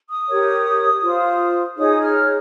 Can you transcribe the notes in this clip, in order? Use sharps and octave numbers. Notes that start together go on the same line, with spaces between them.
D#6
G4 A#4 C#5
F4 C5
D#4 G#4 C#5 D#6
F6